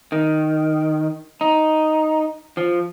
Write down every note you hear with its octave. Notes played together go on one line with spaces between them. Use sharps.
D#3
D#4
F3